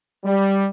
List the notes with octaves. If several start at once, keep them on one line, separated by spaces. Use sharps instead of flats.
G3